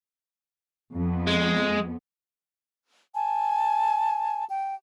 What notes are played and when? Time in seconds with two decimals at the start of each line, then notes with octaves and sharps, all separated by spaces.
0.95 F2 B3
1.27 G#3
3.15 G#5 A5
4.48 G5